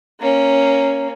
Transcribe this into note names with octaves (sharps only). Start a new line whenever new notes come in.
A#3 C#4